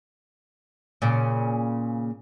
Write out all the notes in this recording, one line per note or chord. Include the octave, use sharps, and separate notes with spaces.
A#2 C#3